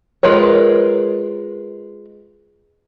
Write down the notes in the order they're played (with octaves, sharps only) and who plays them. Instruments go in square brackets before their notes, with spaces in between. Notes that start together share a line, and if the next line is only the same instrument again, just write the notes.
[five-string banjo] G#3 F4 A#4 B4 C#5